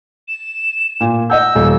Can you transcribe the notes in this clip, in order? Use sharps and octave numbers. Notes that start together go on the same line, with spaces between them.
E7
A#2
D#5 F#5 E6 G6
D#1